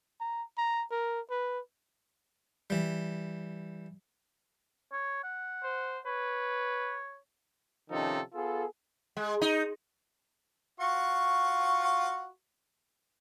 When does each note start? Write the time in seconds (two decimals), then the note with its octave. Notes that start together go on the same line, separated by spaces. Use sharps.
0.21 A#5
0.58 A#5
0.91 A#4
1.30 B4
2.70 E3 G3
4.93 C#5
5.24 F#5
5.63 C5
6.06 B4 C#5
7.91 C3 D#3 F3 C#4 D#4 A4
8.34 B3 F4 G#4 A4
9.17 G#3
9.41 D#4
10.80 F4 F#4 C#6